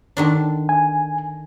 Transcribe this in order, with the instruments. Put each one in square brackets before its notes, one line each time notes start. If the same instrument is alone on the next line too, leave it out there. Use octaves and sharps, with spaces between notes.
[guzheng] D3 D#3 D4
[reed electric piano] G#5